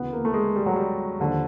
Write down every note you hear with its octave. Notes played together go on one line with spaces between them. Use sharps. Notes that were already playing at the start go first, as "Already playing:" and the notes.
Already playing: D2 C#3 E3 B3
A#3
A3
G#3
G3
F#3
G3
D#2 D3 F3